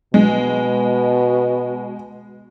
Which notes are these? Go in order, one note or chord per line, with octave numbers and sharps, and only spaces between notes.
B2 G#3